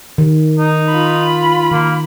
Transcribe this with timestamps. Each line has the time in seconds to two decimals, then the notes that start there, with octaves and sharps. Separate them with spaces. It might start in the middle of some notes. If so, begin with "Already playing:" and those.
0.18 D#3
0.59 D#4
0.90 F4 B5
1.72 D#3 A#3